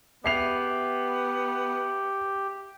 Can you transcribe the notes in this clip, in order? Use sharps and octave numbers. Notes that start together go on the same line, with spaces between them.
B3 G4 E5 C7 F7